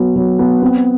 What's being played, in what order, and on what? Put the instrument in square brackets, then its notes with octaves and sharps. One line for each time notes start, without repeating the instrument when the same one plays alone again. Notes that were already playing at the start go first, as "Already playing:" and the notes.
Already playing: [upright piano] F#3 B3
F#3
B3
C4